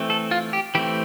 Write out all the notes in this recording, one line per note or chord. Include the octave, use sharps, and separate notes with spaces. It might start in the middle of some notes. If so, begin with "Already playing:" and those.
Already playing: E3 A3 C4
A4
F4
G4
E3 A3 C4 G4